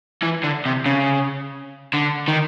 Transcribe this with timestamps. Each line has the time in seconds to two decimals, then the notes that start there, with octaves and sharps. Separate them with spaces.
0.22 E3
0.43 D3
0.66 C3
0.86 C#3
1.94 D3
2.28 D#3